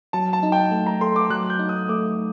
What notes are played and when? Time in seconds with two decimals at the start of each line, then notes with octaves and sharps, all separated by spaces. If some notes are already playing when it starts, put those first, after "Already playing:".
0.13 F#3 A5
0.33 A5
0.43 D#4
0.52 G5
0.71 A3
0.86 A#5
1.01 A4 C6
1.16 D6
1.30 F#3 F#6
1.50 G6
1.59 D#4
1.69 D#6
1.89 A3 D6